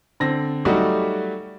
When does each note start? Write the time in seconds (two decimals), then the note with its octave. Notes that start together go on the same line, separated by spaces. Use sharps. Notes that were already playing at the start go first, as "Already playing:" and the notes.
0.20 D3 C4 A#6
0.65 F#3 G3 A3 D#4 F#4 G4